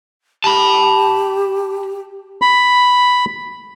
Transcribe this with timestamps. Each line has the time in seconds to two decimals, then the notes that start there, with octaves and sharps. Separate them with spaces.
0.44 G4 A5 B5
2.42 B5